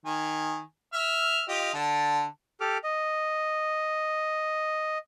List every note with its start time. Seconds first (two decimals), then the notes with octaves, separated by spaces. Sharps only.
0.06 D#3 G#5
0.93 E5 F6
1.49 F4 G4 D#5
1.74 D3 A5
2.61 G4 A4 D6 F6
2.84 D#5